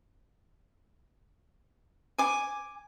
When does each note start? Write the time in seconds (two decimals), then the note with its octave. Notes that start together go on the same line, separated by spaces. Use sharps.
2.18 G#5 D6